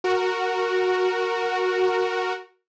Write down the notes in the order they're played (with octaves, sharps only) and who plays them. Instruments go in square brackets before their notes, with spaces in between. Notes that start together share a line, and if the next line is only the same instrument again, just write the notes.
[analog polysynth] F#4 A#4